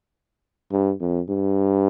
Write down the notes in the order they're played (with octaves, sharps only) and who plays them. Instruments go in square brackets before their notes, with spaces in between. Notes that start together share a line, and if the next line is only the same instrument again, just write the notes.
[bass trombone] G2
F2
G2